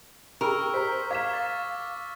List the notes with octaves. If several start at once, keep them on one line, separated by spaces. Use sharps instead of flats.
G4 G#4 A#4 C#6 E6 F6
C5 A#5 B6
F5 D6 F6 G#6 B6 E7
C#6 A6